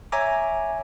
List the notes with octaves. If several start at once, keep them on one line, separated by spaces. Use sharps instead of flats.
C#5 E5 G#5 A#5 D6